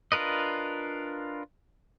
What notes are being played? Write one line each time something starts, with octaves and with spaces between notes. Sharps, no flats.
D4 F4 A#4 B4 D#5